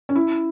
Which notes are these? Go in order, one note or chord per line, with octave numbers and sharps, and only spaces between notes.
C#4
E4